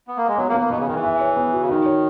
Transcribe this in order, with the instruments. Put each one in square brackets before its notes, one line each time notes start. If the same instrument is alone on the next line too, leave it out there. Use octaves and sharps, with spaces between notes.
[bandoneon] B3
A#3
G#3
[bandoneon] F#3 [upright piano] B3
[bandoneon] A#3
[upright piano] B3
[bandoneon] A#3
[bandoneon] B2 [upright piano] B3
[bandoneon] C#3
[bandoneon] D#3 [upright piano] G#4
[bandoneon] E3
[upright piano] E5
C#5
B3
F#4
[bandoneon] C#3
[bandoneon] D#3 [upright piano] D#4
[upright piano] C#5